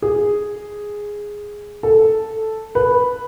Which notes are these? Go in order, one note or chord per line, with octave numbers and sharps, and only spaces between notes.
G#4
A4
B4